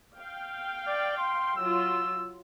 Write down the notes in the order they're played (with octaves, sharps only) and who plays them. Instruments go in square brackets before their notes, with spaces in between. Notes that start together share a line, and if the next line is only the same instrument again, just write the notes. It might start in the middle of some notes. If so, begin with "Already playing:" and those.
[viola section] F5 G5
[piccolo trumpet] D5
C6
[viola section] F#3 F4 [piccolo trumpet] E6